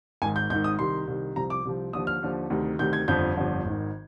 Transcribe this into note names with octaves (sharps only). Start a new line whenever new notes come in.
G#1 G#2 D#3 G#5
G6
G#1 G#2 D#3 G6
D#6
C2 C3 D#3 C6
C2 C3 D#3
C2 C3 F3 A#5
D6
C2 C3 F3
D#2 D3 F3 D#6
F6
D#2 D3 F3
D2 C3 D#3
D2 C3 D#3 G6
G#6
G1 F2 D3 F3 G6
G1 F2 D3 F3
G#1 G#2 D#3